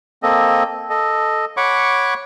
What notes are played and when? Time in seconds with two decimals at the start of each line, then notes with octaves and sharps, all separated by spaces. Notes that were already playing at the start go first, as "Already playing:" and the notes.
0.23 A#3 C4 A4 D#5
0.90 A4 D#5
1.57 C#5 F#5 B5 C#6 D6